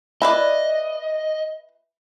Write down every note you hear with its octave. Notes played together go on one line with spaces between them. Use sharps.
E4 B4 D5 D#5